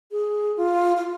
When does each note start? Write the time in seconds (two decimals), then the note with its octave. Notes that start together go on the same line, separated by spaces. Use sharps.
0.11 G#4
0.57 F4
0.97 F4